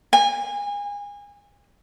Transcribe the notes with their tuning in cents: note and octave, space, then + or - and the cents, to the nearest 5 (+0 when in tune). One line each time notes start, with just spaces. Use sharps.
G#5 -30